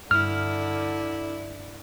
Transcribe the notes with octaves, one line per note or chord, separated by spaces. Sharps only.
G2 D3 E4 F6